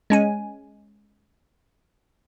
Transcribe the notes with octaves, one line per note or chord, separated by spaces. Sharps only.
G#3 C#4 G#5